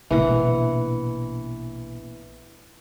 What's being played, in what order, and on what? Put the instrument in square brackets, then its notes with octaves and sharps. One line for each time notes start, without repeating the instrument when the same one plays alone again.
[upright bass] A#1 B2 [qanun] E3 F#5